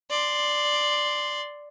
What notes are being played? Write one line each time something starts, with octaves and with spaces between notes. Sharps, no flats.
D5 C6